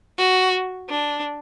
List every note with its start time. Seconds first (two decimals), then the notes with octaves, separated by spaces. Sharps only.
0.18 F#4
0.89 D4